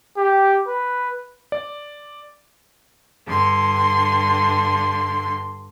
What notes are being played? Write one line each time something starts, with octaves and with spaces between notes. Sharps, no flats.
G4
B4
D5
G2 D3 C6